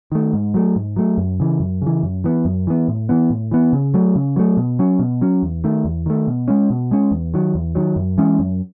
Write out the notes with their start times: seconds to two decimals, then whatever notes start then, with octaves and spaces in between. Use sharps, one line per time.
0.12 D#3 A3
0.34 G#2
0.54 F#3 A3
0.76 G#2
0.96 F#3 A3
1.18 F#2
1.40 C#3 E3
1.60 F#2
1.82 C#3 E3
2.03 F#2
2.24 E3 B3
2.45 F#2
2.67 E3 B3
2.88 A2
3.09 E3 B3
3.30 A2
3.51 E3 B3
3.73 C#3
3.94 F#3 A3
4.16 C#3
4.36 F#3 A3
4.57 B2
4.79 F#3 C#4
4.99 B2
5.21 F#3 C#4
5.43 E2
5.64 D#3 A3
5.85 E2
6.06 D#3 A3
6.28 B2
6.48 G#3 C#4
6.70 B2
6.91 G#3 C#4
7.11 E2
7.34 D#3 F#3
7.55 E2
7.75 D#3 F#3
7.96 F#2
8.18 E3 G#3 C#4
8.39 F#2